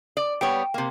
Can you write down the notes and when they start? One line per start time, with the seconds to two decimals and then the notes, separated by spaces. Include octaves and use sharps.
0.17 D5
0.41 G3 B3 C#5 G5
0.74 C3 A#3